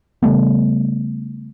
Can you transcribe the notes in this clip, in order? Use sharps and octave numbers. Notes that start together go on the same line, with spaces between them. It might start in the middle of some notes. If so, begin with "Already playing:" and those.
C#3 G3 A3 B3